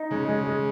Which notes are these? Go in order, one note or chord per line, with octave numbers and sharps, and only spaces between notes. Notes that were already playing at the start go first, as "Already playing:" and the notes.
Already playing: D#4
C#3 G#3
G#3
G#3